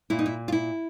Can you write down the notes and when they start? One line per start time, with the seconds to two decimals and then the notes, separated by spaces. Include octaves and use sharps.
0.10 A#2 E4
0.19 D#4
0.26 E4
0.48 F4
0.52 E4